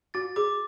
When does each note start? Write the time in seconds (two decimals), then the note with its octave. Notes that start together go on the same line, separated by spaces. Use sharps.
0.14 F#4 A6
0.36 G#4 D6